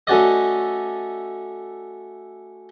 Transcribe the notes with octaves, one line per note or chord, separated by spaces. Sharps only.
A3 C#4 F#4 D5 D#5